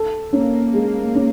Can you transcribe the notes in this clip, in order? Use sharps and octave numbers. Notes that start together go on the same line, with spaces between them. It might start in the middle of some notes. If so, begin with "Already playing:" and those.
Already playing: A4
A#3 C#4
G#3
C#4